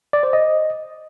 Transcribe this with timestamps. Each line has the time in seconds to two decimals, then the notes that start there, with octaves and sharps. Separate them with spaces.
0.13 D5
0.23 C5
0.33 D#5